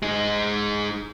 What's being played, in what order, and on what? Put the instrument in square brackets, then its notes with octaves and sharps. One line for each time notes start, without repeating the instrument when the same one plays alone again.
[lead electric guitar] G#3 D#4